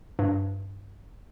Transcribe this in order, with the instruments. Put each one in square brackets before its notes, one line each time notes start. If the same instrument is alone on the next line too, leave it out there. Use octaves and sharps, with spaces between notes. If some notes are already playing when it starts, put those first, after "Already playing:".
[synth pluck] G2